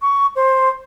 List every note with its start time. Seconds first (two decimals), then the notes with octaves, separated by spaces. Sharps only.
0.01 C#6
0.35 C5